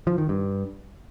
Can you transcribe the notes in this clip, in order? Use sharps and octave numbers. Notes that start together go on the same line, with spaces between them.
F3
D#3
G2